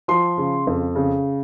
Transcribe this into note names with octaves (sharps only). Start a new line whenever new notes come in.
F3 C6
C#3
F2
C#3